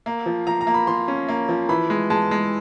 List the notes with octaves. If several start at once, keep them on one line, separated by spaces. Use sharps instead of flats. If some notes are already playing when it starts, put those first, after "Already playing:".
A#3
F3
F3 A#5
A#5
A#3
B5
F3 C6
C#4
A#3
F3
E3 B5
G#3
G#3 A5
G#3